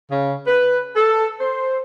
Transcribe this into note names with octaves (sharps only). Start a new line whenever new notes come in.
C#3
B4
A4
C5